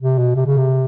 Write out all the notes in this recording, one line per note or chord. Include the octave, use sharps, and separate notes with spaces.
C3
B2
C3
C#3
C3